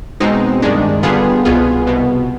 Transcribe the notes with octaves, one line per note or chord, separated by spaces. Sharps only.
B2 G#3 C4 D#4
G2 D#3 G#3 D4
D3 G3 B3 F4 G#4
C2 B2 B3 F4 G#4
C2 B2 B3